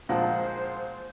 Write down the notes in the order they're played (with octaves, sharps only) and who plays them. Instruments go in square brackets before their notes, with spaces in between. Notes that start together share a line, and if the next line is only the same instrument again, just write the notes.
[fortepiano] A#2 F3 G#3 [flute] C5 [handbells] F5 [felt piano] F#5 A5